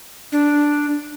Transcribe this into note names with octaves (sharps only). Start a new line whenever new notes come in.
D4